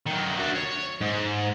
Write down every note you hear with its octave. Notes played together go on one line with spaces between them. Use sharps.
D#3 F#3
D4 F#4
C#5
G#2